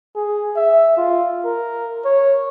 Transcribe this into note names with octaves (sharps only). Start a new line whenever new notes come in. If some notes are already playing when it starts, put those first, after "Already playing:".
G#4
E5
F4
A#4
C#5